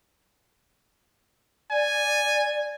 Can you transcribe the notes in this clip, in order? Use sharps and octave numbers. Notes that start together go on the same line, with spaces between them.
D5 G#5